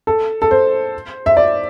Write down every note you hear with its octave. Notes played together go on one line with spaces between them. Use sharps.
A4
A4
C5
E5
D5